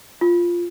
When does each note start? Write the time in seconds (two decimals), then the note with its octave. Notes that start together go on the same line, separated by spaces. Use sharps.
0.21 F4